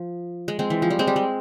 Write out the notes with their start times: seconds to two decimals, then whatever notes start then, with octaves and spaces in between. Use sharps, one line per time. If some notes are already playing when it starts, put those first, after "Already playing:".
Already playing: F3
0.48 G#3
0.59 G#3 C4
0.70 E3
0.82 F3
0.90 G3
0.99 G#3 C4
1.07 G3
1.16 G#3